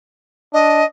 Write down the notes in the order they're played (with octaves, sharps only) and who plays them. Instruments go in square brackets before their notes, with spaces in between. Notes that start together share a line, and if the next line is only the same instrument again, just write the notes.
[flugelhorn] D4 [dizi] D#5